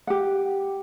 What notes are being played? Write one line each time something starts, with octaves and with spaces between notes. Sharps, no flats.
G4 F#5